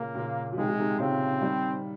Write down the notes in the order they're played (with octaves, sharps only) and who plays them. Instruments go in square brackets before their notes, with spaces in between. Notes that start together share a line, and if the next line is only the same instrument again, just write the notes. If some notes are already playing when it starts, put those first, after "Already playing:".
Already playing: [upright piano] A#2 C#3 [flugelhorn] A#3
[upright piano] A#2 C#3
F3
[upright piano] C3 D#3 [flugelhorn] G#3
[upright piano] C3 D#3
C3 D#3
[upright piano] A#2 C#3 [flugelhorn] C4
[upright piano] D#3 G3